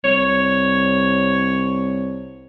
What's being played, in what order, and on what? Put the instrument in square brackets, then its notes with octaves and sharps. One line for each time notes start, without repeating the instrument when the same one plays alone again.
[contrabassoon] C2 [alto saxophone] C#5